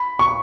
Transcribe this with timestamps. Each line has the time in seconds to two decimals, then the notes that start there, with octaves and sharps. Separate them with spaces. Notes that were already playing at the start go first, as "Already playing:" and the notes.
Already playing: B5
0.19 C#6